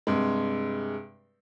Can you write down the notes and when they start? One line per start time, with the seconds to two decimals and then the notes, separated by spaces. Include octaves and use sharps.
0.07 G2 C3 G#3